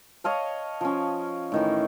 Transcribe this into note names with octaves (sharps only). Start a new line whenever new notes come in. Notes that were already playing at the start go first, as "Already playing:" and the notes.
C#5 D#5 F5 A5
F3 C#4
A2 D#3 E3